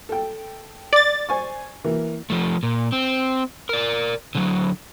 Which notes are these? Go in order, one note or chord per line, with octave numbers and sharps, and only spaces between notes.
A4 G5
D5 A6
C5 G#5 C#6
E3 A#3
F3 A3
A#2
C4
A#4 D5
D3 F#3